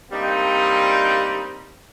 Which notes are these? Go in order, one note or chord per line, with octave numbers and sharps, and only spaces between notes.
G3 A#3 C4 D4 D#4